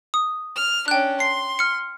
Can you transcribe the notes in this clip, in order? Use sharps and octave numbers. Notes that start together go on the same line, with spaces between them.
D#6
F6
C#4 D4 G5 F#6
C6 C7
F6 C#7